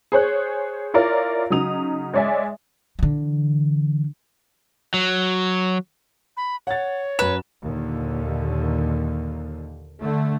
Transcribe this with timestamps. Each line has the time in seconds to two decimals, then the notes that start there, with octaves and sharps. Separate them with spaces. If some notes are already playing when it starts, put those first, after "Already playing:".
0.12 G#4 C5 C#5 F#6
0.94 E4 F4 A#4 C#5 D5
1.50 C#3 F#3 D#4 D#6 F7
2.14 G#3 C#5 D5 E5 G#5
2.99 D3 E3
4.94 F#3
6.37 B5
6.67 C#5 F#5 A6
7.19 F#2 B4 E7
7.65 D#2 A#2 D3
10.02 D3 A3